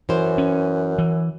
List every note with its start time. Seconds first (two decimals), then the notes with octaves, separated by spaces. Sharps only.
0.09 F#2 E3 C5
0.38 C#4
0.98 E3